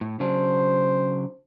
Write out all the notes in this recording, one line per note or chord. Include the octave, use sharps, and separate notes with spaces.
A2
C#3 F#3 D4 C5